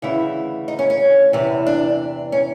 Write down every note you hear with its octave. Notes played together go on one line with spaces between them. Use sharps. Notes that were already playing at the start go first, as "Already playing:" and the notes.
D2 C#3 E3 E4
D#4
C#4
C#4
E2 C3 E3
D4
C#4